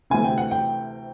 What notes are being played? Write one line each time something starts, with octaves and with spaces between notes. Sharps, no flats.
D2 C3 E3 A3 G#5
G5
F#5
G5